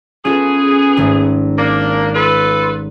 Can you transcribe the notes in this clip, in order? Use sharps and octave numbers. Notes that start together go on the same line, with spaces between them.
B3 C#4 F4 G#4 A4
G#1 A3
A#3 D4
F4 A4 B4